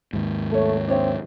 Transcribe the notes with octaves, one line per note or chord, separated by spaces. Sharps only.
D#2 G#2
A3 A4 B4 C#5
C4 D4 C#5 E5